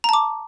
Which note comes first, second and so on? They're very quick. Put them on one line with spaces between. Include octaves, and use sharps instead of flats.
A#5 A5 D6